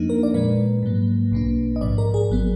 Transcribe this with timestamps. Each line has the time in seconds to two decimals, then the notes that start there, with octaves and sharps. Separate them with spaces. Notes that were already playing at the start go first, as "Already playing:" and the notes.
Already playing: F2 F3 A#3 D4 D#4
0.09 A#4
0.23 D5
0.34 A#2 F3 G#3 B4
0.83 G#2 F#3 A#3
1.32 B1 B2 A#3 D4
1.76 D#5
1.81 A#1 G#2 F3 D5
1.98 A#4
2.14 G#4
2.30 G#1 F#3 B3